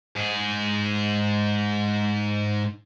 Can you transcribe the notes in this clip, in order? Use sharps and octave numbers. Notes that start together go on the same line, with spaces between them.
G#2 G#4